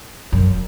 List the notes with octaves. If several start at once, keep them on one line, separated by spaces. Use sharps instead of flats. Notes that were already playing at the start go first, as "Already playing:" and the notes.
F#2